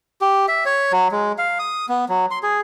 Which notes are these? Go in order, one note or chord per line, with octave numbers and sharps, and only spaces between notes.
G4
E5
C#5
F#3
G#3
F5
D#6
B3
F#3
C6
G#4